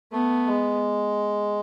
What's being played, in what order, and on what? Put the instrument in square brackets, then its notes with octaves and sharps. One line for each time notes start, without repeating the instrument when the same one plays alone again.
[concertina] A3 [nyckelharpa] B3
[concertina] G#3